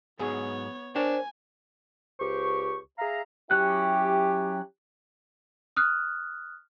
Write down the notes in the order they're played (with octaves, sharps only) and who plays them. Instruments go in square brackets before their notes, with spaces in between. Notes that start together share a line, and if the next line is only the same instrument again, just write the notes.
[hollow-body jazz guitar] G#2 F#3 G#4 [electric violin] B3 C#5
[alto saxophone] D4 [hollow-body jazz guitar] A#4 C#5 G5 [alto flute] C5 [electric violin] G#5
[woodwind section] C#2 G4 C5 C#6
G#4 E5 F5 A#5
[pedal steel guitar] F#3 C#4 F#6 [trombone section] E4 G4
[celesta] D#6 F6 F#6